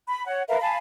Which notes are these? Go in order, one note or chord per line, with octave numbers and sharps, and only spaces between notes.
B5
C#5 F#5
A#4 B4 E5 F5
F5 G#5 A5 B5